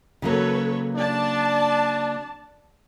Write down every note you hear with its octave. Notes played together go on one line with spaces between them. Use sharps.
C#3 F#3 A#3 A4 B4 C#5
D4 D5 A5